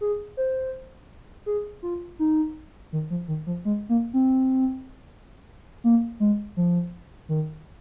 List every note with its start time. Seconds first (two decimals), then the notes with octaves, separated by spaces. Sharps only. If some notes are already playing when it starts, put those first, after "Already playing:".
0.01 G#4
0.37 C5
1.46 G#4
1.83 F4
2.19 D#4
2.93 D#3
3.10 F3
3.28 D#3
3.47 F3
3.65 G#3
3.89 A#3
4.14 C4
5.84 A#3
6.20 G#3
6.57 F3
7.29 D#3